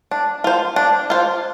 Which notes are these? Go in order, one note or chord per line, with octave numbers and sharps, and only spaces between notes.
D4
F4 C5
D4
F4 C5